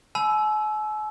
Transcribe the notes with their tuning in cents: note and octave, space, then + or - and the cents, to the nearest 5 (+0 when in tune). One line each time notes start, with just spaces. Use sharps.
G#5 +45 B5 +15 E6 +0